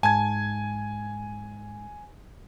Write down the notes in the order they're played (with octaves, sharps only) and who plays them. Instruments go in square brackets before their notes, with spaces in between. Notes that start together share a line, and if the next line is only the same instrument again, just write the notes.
[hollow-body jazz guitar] G#2 [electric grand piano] G#5 G#6 [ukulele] A5